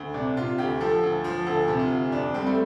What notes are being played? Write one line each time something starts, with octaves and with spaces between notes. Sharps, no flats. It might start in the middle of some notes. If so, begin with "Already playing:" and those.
Already playing: D2
C3 D4
C3 F4
D2 G4
F3 A4
D2
F3
D2 A4
C3
F4
D2
F2 D4
G3 C4
A3